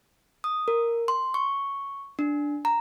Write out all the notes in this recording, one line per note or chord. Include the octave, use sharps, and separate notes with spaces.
D#6
A#4
C6
C#6
D4
A#5